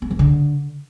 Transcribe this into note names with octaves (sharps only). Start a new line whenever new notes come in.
B3
E3
D3